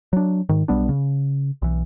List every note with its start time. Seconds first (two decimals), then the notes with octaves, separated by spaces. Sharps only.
0.13 F#3 D4
0.49 G#2 D#3
0.68 B1 G3 B3 D4
0.89 C#3
1.62 B1 E3